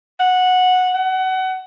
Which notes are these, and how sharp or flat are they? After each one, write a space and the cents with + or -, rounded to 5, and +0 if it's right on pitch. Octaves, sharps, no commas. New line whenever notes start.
F#5 -10
F#5 +25